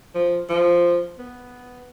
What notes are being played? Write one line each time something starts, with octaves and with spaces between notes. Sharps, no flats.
F3
F3
B3